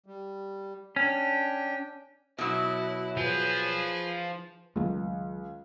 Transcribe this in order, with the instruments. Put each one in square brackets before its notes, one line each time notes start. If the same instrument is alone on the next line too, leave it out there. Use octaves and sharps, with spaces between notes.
[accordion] G3
[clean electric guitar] C#4 [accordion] D4 G5
[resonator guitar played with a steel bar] B2 F#3 [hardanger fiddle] E4
[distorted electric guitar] F3 [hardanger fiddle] G#4 B4
[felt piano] C#2 [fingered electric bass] D#3 F#3 A3